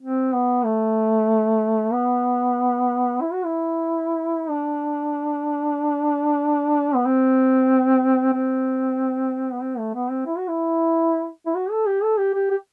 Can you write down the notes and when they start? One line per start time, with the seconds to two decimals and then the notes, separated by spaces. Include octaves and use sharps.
0.01 C4
0.33 B3
0.65 A3
1.93 B3
3.21 E4
3.33 F#4
3.45 E4
4.49 D4
6.95 B3
7.06 C4
8.34 C4
9.52 B3
9.62 C4
9.78 A3
9.94 B3
10.10 C4
10.26 E4
10.37 F#4
10.48 E4
11.46 E4
11.55 F#4
11.71 A4
11.87 G4
12.03 A4
12.18 G4
12.35 G4
12.51 G4